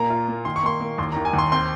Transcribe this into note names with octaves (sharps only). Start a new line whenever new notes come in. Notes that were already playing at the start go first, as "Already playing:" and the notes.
Already playing: A#2 A#3 A#5
F4
A#3
D#3 C6
C#6
A#3 C6
A#3
D#2 C6
A#5
D#3
G#5
D#2
C6
C4 C6